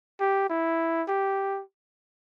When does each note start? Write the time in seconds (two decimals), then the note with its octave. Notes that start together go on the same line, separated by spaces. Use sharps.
0.20 G4
0.50 E4
1.08 G4